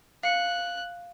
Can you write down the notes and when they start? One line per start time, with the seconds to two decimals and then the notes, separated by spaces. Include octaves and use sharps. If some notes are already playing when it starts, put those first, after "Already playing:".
0.23 F5 F#6 C#7